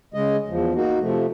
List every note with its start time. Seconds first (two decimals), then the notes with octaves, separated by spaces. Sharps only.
0.14 C#3 G#3 D#5
0.49 E2 F3
0.74 A#3 D#4 F#4
1.00 C3 F3 A3